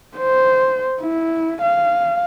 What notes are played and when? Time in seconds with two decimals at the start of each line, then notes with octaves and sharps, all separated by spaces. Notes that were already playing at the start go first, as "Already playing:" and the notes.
0.17 C5
1.01 E4
1.62 F5